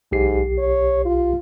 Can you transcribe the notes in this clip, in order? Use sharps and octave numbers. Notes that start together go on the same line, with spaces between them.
B1 G#2 G4 C7
C#5
F4